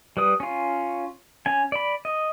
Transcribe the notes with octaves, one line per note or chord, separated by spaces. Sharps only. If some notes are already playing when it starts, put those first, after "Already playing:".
G3 B4 D#6
C#4 F4
C#4 G#5
D5 B5
D#5